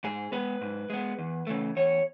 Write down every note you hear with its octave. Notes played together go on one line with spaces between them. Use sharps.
G#2 G#4
G#3 B3 B4
G#2
G#3 B3
E2
C#3 E3 A3
E2 C#5